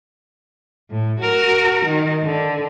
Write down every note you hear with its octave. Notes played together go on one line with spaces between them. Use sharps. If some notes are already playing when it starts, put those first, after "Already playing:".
A2
F#4 A#4
D#3
D3